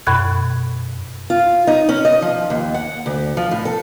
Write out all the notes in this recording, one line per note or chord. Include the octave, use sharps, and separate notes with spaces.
F#2 B2 B5 C#6 F#6 G#6
F4
D#4
C#4
D#5
F3
D#2
F#5
D2
F3
A2
A4